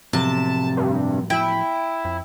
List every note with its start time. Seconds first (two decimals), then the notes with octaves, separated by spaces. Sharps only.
0.13 A2 C3 F3 F#3 A5
0.77 G2
1.30 E4 G5
2.05 F2